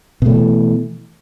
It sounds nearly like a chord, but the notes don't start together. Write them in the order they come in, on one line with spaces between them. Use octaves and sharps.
B2 A3 F3 E3